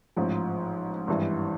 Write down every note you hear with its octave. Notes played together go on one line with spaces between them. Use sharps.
A1 G#2 F3
G#1 G2 E3